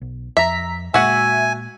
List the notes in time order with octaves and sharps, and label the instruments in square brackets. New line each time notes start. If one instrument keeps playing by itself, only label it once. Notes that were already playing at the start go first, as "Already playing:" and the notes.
[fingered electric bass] B1
[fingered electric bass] F2 [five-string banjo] E5 [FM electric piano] A#5 B6
[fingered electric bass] A#2 G#3 A#3 [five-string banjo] F#4 F#5 [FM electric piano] E5 [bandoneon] G#5